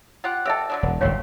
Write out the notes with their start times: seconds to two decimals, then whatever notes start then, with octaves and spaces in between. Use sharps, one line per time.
0.24 F4 G4 F#5
0.46 G4 A4 D#5 E5 E6
0.70 D3 F#3 D4
0.83 E1
1.01 G1 F#2 A2 D3 C4 C#5 F5 C#6